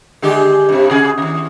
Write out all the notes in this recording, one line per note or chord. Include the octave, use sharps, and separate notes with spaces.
D3 G#3 G4
G2 C3
C3 F#4 G#4
D#2 C#3